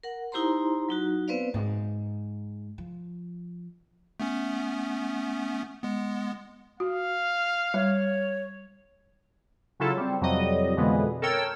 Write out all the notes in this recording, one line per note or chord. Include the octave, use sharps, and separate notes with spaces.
A#4 F#5
D#4 E4 G4 C5 A#5 C6
F#3 D#4 F#4
B3 C4 B4 C5 D5 F5
G#2
F3
A3 B3 C#4
G#3 B3
F#4 F5
G3 C#5
C#3 F#3 E4 F4 A4
G3 C4
F2 C3 F#3 G3 D#5
F2 B2 D3 E3 G#3 B3
A4 A#4 C#5 G5 E6